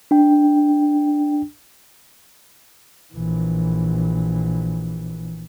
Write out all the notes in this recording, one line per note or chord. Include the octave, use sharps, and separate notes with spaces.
D4 G5
A#1 E3